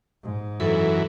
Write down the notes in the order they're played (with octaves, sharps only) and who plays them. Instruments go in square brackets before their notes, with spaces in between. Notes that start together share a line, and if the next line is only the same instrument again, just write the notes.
[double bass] G#2
[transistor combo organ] F#2 E3 [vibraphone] A4